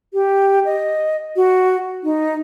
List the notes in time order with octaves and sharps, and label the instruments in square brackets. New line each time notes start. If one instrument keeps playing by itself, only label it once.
[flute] G4
D#5
F#4
D#4